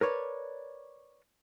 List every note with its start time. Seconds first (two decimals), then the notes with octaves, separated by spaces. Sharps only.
0.01 A#4 B4 C#5 D5